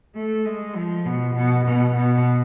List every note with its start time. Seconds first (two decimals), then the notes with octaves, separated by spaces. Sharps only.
0.15 A3
0.45 G#3
0.75 F3
1.06 B2
1.35 B2
1.65 B2
1.95 B2